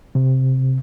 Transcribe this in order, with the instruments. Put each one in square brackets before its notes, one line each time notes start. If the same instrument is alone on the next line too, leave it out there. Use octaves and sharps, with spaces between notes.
[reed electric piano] C3